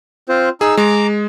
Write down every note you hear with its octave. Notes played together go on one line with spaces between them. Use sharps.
C4 F4 C5
D#4 G#4 E6
G#3 A#5 D6